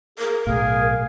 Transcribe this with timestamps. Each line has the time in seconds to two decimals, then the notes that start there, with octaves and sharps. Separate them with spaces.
0.18 G#4 A#4
0.47 B1 A2 G#4 F5